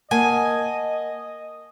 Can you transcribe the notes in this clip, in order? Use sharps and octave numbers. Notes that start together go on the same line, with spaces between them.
A#3 D#5 F#5 G#5 A5